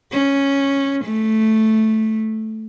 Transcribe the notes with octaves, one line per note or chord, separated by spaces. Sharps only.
C#4
A3